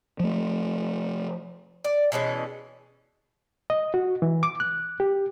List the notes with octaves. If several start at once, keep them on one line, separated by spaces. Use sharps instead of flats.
F3 A3
D5
B2 E3 G#3 C#4
D#5
F#4
E3
D6
F#6
G4